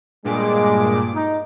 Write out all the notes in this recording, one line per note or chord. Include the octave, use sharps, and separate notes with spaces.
G2 A#2 G#3 D6
D#4